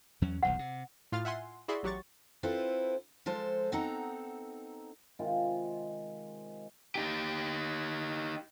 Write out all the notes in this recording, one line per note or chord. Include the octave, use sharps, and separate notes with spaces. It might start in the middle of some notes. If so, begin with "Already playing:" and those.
E2 F#3 C#4
D#1 B1 E2 F#5
C3
A2 F4 F5 F6 A6
E5 F#5 G#5 C6
E4 F#4 G#4 D5 E5 C6
A1 F#3 G4 F#5 C#6 A6
C4 E4 F4 A4 B4 C5
F3 G#3 A4 C5
B3 C4 D#4 A4 F#5 A#5
C3 D#3 G#3 F4
D#4 G4